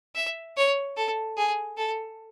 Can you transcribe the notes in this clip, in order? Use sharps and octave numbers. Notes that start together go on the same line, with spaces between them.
E5
C#5
A4
G#4
A4